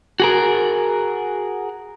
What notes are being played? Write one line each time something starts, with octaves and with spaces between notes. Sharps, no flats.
F#4 G#4 A#4